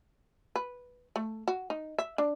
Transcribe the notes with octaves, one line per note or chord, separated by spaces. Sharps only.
B4
A3
F#4
D#4
E5
D4